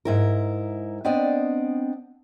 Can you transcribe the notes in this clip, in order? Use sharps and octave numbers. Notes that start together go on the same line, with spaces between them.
G#2 E4 A#4
B3 C4 D4 D5 D#5